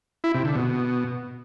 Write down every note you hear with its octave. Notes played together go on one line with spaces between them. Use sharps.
E4
C3
D3
B2